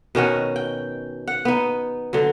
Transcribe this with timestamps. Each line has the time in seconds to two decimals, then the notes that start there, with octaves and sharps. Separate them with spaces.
0.15 B2 D#3 C#4 F#4
0.56 G5
1.27 F#5
1.45 B3 D#4
2.13 D3 F#3